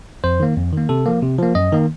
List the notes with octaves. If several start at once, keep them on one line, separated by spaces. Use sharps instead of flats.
F2 C5
D#3 A#3
F2
D#3 A#3
C3 A4
F3 A#3
C3
F3 A#3
F#2 D#5
D#3 A#3